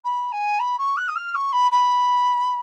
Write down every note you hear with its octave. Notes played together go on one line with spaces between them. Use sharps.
B5
G#5
B5
C#6
F#6
D#6
F6
C#6
B5
B5